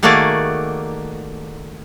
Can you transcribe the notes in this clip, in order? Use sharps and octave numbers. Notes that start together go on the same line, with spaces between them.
D#3 A3 A#3 F#4 G#4 D5